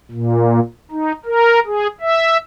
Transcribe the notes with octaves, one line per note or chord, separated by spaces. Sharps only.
A#2
D#4
A#4
G#4
E5